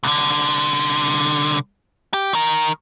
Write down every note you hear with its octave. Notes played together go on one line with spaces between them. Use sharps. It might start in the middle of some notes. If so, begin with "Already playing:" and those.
C2 D3
G4
D#3 A#4